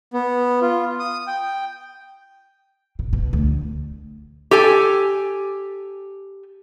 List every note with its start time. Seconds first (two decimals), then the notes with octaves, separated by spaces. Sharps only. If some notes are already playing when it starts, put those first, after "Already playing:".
0.13 B3
0.61 F4
0.99 D#6
1.27 G5
2.99 B2
3.13 B2
3.33 D2
4.51 G4 A4 G#5